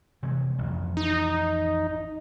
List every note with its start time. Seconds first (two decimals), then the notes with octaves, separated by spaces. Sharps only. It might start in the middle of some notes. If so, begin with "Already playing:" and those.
0.23 C3 E3 G#3
0.58 A1 F2
0.97 D#4